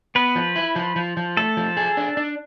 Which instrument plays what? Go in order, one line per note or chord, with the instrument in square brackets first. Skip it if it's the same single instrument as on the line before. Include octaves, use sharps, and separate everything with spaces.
[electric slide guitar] B3 [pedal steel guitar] B4
[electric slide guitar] F3
E4
F3
F3
F3
[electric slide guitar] A3 [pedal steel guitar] A4
[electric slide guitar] F3
G#4
D4
D4